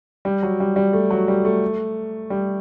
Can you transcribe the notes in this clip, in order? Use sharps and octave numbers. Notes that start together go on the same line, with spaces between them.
G3
F#3
G3
G3
A3
F#3
G3
A3
G3